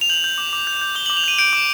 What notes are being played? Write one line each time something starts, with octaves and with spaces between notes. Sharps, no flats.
F7
G6 F#7
G6
D6
D6
G6
G6
D6 G7
F#7
D6
F7
G6 D#7
G6 D7
D6